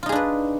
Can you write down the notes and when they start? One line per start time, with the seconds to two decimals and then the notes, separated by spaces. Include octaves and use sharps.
0.03 F4
0.06 D#4
0.09 G#4
0.12 D4
0.15 B4